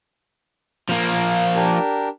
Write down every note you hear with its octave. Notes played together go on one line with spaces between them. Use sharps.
F3 A#3
D4 G4 A#4